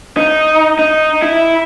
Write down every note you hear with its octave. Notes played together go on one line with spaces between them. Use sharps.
D#4
D#4
E4